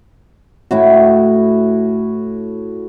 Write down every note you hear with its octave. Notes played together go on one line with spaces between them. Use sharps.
A2 E4 F#4